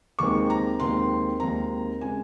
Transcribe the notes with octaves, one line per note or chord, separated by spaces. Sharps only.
D#2 D#3 G#3 C4 C#6
A#5
D#2 D#3 G#3 C4 C6
D#2 D#3 G#3 C4 A#5
C#3 G#3 C4 G#5